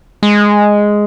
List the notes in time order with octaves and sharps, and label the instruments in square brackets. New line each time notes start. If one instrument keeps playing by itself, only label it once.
[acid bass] G#3